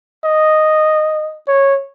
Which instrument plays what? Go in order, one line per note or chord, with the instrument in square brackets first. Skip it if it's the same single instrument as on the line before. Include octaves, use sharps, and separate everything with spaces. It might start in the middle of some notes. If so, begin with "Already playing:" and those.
[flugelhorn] D#5
C#5